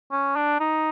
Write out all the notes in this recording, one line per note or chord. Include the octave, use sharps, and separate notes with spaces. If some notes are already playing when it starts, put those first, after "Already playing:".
C#4
D4
D#4